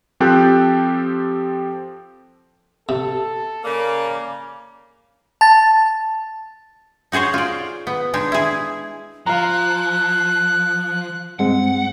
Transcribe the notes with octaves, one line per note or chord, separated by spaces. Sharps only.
F3 C4 G4 A4 G5 F#6
C3 A4
C#3 A#3 D5
A5 A6
D#4 F#4 G#4 C5 C#5
F4 D5
B3
G#3 D4 D#4
E4 G#4
F3 F5 A#5 F#6
G2 G#3 C4 F#5